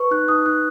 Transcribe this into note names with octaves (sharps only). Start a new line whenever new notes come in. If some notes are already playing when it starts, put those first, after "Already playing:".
Already playing: B4 C#6
D#4 F#6
D#4 D#6
D#4 F#6